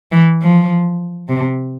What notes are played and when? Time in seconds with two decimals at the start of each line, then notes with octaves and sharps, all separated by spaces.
0.12 E3
0.42 F3
1.28 C3